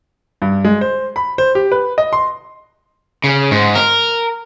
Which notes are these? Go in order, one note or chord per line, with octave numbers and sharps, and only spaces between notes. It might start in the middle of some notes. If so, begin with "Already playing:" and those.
G2
G#3
C5
B5
C5
G4
B4
D#5
C6
C#3
G#2
A#4